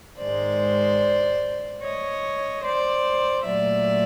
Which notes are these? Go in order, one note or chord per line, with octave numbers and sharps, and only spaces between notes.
G#2 D#3 G#3 C5 D5
C#5 D#5
C5 D5
A#2 F#3 A3 D5 E5